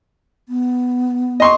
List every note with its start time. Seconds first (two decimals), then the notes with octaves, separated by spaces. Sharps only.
0.49 B3
1.40 D#5 C6 C#6